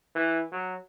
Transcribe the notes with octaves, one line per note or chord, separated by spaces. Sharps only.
E3
F#3